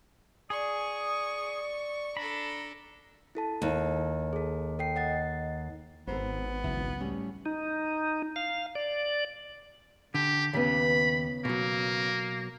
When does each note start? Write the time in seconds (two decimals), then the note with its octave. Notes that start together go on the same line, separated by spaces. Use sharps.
0.50 G#4 D5 C#6 D#6
2.17 D4 A4 A#5 B5
3.35 E4 A4 A5
3.62 D#2
4.33 G#4 A4
4.79 A4 G5 C7
4.96 D#5 F#5 A6
6.07 G#1 B3 A4 A#4 C5
6.64 C#2 C#3 F#3 E4
7.00 A2 G3 C#4
7.46 D#4
8.36 F5
8.75 D5
10.15 D3 G4
10.53 D#2 C#3 B3 B5
11.45 B2 F#3 A#3